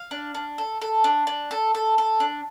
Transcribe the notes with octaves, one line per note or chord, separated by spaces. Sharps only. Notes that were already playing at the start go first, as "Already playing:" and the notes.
Already playing: F5
D4
D4
A4
A4
D4
D4
A4
A4
A4
D4